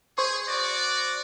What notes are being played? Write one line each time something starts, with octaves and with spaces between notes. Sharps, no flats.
G#4 C5 C6 C#6
F#4 D5